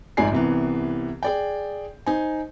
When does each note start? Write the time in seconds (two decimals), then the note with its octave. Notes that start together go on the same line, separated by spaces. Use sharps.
0.17 A#1 G#2 D#4 D5 G#5 C7
0.32 C2 C3 E3 B3
1.23 G#4 D5 G5
2.06 D#4 C5 G#5